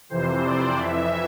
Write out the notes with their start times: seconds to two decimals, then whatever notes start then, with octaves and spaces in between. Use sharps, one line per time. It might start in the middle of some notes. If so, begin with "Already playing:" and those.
0.09 F2 C3 E3 C5
0.44 D5
0.79 F2 E3 E5